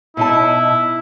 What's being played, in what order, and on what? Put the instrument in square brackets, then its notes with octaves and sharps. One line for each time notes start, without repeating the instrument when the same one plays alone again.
[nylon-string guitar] B2 D#4 A5 [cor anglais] E4